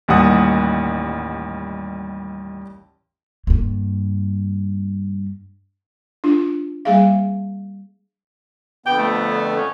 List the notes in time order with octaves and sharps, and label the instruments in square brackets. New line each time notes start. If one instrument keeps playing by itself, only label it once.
[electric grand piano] A1 D#2 G3 F#5 D#6
[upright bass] G2 A#3
[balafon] D4 F4
G3 A#3 G#4 E5 F5
[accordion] F2 D3 B3 [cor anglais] G5
[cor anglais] A3
C#4